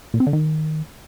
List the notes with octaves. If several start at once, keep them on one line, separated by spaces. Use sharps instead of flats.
A#2
C4
D3
D#3